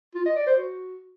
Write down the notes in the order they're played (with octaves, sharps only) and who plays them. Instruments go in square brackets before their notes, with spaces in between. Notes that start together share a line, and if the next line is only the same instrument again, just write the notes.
[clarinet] F4
D#5
D5
C5
F#4